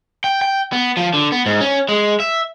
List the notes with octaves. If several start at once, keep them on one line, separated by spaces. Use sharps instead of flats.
G5
G5
B3
F3
D3
B3
G#2
C#4
G#3
E5